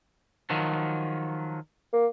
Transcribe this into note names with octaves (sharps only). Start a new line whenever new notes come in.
D#3 F3 F#3
A#3